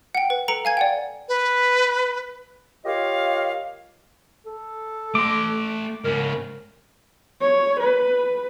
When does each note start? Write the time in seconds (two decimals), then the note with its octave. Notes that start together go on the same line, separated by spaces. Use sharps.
0.15 F#5 G5
0.30 B4
0.48 A4 B4 A#5 C#7 D7 F#7
0.65 F5 G#5 G#6
0.77 D5 F#5 G5
1.29 B4
2.85 F4 G4 A#4 C#5 D#5 F5
4.46 A4
5.15 A3 C6 D6
6.05 G#2 C#3 A#4
7.41 C#5
7.80 B4